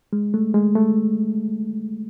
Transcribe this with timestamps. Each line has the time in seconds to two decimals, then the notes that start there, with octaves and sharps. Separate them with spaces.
0.13 G#3
0.34 A3
0.54 G#3
0.75 A3